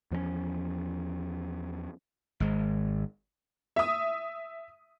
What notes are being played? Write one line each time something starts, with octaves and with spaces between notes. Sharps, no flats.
E2 F3 G#3 C#4
G#1 G#3
E5 D#6